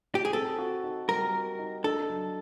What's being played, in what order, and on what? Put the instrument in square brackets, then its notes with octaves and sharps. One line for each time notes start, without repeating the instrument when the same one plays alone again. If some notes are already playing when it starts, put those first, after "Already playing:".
[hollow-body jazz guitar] G4
G#4
[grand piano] C4 [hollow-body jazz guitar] A4
[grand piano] F#4
D#4
[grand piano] G3 [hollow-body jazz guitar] A#4
[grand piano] F#4
D#4
[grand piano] D4 [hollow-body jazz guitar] A4
[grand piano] F#3